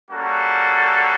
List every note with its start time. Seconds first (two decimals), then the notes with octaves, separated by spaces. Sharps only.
0.10 G3 A#3 C#4 F#4 A4